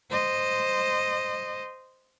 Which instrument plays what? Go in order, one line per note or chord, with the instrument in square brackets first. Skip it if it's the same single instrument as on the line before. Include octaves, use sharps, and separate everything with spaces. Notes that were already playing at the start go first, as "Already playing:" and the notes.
[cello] C5 D#5